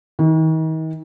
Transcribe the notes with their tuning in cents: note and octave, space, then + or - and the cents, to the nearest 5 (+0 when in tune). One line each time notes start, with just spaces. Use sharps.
D#3 +40